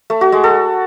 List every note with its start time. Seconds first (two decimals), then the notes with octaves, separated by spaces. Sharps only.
0.10 A3
0.21 F#4
0.32 G#3
0.44 A4